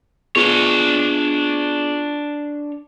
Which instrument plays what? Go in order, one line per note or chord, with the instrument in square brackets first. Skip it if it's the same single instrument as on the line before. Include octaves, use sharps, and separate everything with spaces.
[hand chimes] B3 F4 G#4 [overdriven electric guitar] D4 C#5